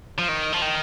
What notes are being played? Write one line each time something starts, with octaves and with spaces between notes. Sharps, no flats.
F3
D#3
F3
D#3